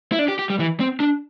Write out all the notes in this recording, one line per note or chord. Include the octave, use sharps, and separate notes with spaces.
E4
D4
G4
G4
G3
E3
C4
D4